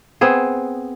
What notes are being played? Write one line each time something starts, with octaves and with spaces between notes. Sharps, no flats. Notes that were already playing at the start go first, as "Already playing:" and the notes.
B3 C4 G#4